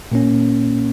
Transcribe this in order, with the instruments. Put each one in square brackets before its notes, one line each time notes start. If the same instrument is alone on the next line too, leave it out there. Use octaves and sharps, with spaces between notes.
[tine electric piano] A#2 A#3 C#4